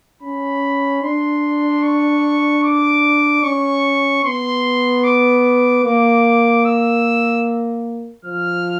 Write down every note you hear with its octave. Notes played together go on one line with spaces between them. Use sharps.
C#4 B5
D4 C6
C#6
D6
C#4 C#6
B3 C6
D6
A#3 D6
E6
F3 F6